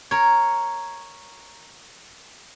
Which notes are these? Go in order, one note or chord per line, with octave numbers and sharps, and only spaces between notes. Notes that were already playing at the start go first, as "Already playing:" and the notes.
A#4 C#5